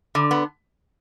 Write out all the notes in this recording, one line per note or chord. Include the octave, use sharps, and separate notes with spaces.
D3
B3